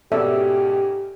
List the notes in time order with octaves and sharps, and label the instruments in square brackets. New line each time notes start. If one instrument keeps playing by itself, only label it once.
[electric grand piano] G#2 B2 C#4 [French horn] G4 [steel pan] A4 D5 E5